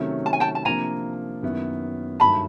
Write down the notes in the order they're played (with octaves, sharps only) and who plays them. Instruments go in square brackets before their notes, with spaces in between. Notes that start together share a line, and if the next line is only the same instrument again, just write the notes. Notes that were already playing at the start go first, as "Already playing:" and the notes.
Already playing: [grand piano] C3 D#3 F#3 A3 C#4
[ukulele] A5
G#5
G5 A5
A5
[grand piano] C3 F3 A#3 D4 [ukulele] G#5 A#5
[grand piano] F#2 D#3 F#3 B3 E4
[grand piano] G2 D#3 F#3 A3 [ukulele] A5 B5